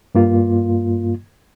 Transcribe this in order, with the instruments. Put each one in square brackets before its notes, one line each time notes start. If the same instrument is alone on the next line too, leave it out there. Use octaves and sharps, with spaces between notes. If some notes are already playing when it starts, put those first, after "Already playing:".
[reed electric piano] G2 A#3 F4